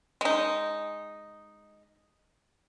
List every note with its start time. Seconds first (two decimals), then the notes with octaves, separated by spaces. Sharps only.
0.21 G#3 D#4